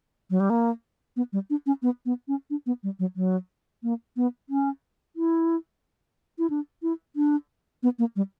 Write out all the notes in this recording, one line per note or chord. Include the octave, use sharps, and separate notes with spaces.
F#3
G3
A#3
B3
G3
D4
C#4
B3
B3
C#4
D4
B3
G3
F#3
F#3
A#3
B3
C#4
E4
E4
D4
E4
D4
B3
A#3
G3